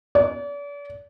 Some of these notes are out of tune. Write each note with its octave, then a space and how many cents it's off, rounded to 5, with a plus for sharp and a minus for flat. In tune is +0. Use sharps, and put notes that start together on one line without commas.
D5 -40